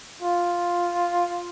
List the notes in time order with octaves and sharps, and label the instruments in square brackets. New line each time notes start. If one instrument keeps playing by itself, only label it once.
[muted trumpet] F4